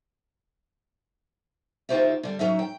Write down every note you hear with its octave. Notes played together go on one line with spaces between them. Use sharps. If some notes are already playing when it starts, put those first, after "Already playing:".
D2 D#4 F4 G4 C5 E5
D3 G3
F#3 C#4 D#4 E5
G5